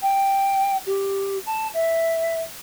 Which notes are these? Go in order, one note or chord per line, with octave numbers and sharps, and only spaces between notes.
G5
G4
A5
E5